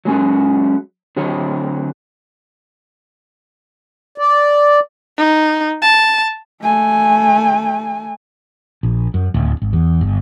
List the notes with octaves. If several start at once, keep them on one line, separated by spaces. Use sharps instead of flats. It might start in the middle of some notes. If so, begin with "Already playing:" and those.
F#3 G#3 C#4 F#4
D3 F#3 C4 F#4 C#5
D5
D#4
A5
A3 G#5
A#1
F#2
D1
G#1
E2
G1